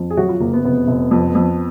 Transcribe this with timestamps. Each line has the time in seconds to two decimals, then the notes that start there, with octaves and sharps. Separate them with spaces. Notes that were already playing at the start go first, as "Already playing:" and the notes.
Already playing: F2
0.10 G#4
0.17 F#3 F#4
0.29 F4
0.40 F#1 A#3
0.53 B3
0.65 F1 B3
0.87 F1
1.11 F2
1.35 F2